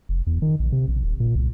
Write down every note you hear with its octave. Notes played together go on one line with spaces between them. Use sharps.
F1
E2
D#3
A#1
C3
A#1
D#1
A#2
C2